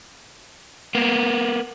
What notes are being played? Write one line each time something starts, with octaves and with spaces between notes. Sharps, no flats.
A#3 B3